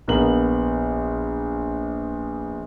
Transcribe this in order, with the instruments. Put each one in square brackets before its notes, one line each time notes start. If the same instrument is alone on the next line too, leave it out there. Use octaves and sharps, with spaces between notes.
[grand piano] A#1 B3 A#4 F#7